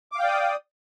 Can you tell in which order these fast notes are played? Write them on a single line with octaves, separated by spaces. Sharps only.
D6 F5 G5 D5 D#6